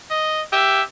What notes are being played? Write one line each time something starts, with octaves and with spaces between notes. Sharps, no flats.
D#5
G4 E5